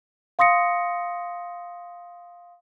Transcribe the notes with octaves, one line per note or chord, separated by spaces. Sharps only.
F5 C6 D#6 A#6 C#7